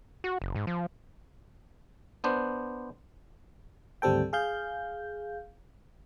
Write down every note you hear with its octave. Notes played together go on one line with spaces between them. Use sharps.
F#4
F#1
G#2
F3
B3 D4 C5
G#1 D2 G3 C4 A4 G5
G#4 F5 G6